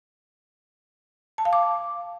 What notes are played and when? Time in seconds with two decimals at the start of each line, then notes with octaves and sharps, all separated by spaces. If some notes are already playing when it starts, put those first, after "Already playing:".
1.38 A5
1.45 F5
1.53 D6